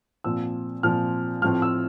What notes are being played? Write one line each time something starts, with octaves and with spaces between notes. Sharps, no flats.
A#2 F3 C4 E6
A#2 F3 C4 F6
A2 F3 A3 C4 F6
E6